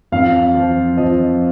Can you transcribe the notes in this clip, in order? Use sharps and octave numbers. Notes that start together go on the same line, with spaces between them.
F2 F5
F3
F3 D#5